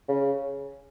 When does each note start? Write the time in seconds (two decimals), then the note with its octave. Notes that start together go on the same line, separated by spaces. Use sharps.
0.09 C#3